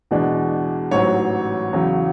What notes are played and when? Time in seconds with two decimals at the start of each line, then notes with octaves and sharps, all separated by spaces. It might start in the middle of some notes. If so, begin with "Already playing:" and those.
0.11 E2 B2 G#3 D4
0.91 A1 G#2 F#3 C#5
1.73 E2 C#3 F#3